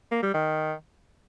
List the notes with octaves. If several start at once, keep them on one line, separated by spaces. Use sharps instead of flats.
A#3
G3
D#3